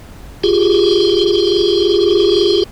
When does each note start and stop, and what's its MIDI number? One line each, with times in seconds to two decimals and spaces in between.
0.44 2.63 65
0.44 2.63 67
0.44 2.63 68